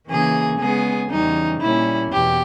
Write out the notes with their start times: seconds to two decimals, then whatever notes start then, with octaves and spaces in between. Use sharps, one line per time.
0.09 C#3 E3 A#3 G#4
0.60 C#3 G#3 B3 G#4
1.11 E2 C#3 E3 G3 D#4
1.61 A#2 G3 A#3 C#4 E4
2.13 E2 B2 G4